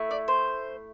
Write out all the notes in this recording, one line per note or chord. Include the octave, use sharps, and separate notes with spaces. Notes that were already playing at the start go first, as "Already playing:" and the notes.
Already playing: A3 E4
D5
C5